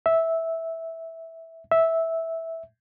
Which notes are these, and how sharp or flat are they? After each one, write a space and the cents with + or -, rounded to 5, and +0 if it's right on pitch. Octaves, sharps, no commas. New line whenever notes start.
E5 -10
E5 -10